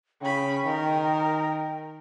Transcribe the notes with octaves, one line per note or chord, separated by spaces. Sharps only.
C#3 C#4 G5 B5
D#3 A#4